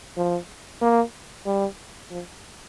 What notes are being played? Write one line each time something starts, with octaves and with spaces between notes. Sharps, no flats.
F3
A#3
G3
F3